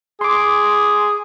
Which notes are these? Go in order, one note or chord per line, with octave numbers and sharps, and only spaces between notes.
G#4 C6 D6